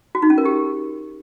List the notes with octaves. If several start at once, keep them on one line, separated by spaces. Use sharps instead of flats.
F#4
D#4
C#4
A#4
G4